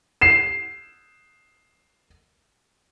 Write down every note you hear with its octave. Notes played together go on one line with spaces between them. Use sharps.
C7 E7